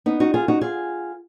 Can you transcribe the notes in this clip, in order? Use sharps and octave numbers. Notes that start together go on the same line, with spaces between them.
B3 D#4
D#4 F#4
F4 G#4
D#4 F#4
F4 G#4